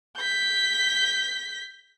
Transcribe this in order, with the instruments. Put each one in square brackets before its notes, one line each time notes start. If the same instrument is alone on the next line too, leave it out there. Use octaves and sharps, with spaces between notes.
[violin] G6 B6